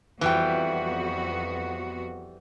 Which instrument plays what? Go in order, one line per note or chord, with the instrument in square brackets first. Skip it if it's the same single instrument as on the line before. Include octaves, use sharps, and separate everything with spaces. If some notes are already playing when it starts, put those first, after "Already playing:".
[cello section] F2 B3 F#4 [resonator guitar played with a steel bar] E3 G3 G5